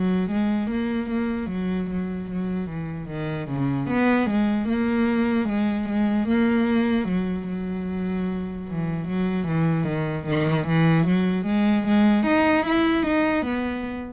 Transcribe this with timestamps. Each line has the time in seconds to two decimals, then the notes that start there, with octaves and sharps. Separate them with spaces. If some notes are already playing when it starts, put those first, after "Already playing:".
Already playing: F#3
0.31 G#3
0.71 A#3
1.11 A#3
1.51 F#3
1.90 F#3
2.31 F#3
2.70 E3
3.10 D#3
3.50 C#3
3.90 B3
4.30 G#3
4.69 A#3
5.49 G#3
5.89 G#3
6.29 A#3
7.08 F#3
7.48 F#3
8.69 E3
9.08 F#3
9.48 E3
9.88 D#3
10.27 D#3
10.68 E3
11.07 F#3
11.46 G#3
11.87 G#3
12.26 D#4
12.66 E4
13.06 D#4
13.47 B3